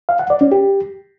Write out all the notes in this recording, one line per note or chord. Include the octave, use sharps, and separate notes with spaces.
F5
F#5
D5
C#4
G4